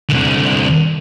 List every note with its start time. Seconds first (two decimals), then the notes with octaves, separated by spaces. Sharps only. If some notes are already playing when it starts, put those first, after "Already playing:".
0.09 C2 D3